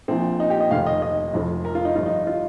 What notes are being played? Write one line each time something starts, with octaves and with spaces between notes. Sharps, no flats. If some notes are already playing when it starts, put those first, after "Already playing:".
A#1 A#2 F3 C4
D#4
G4
D#5
F1 D#2 D#3 F5
D#5
D#5
F1 F2 F3
A#4
F4
D#4
G1 G2 F3 F4
D#4
F4